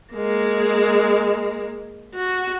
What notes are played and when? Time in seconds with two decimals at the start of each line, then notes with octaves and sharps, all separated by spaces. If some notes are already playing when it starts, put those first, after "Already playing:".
0.13 G#3 A#3
2.15 F#4